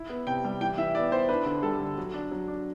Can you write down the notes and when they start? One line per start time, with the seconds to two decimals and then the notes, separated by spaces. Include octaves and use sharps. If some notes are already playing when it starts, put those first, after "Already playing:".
Already playing: E4
0.09 B3
0.27 C3 G5
0.45 G3
0.61 E3 G5
0.78 E3 E5
0.95 B3 D5
1.12 B3 C5
1.29 D4 B4
1.46 D3
1.63 G3 A4
1.80 D3
1.98 F#3
2.14 D4
2.31 F#3
2.48 D4